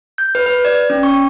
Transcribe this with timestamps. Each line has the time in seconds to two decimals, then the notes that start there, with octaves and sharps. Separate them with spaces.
0.18 G6
0.35 B4
0.46 B4
0.65 D5
0.90 C#4
1.03 C#6